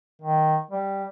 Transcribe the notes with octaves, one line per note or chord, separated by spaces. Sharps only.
D#3
G3